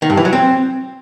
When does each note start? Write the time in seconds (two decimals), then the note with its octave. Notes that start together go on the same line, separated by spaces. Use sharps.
0.02 D#3
0.10 G2
0.17 E3
0.25 F#3
0.33 C4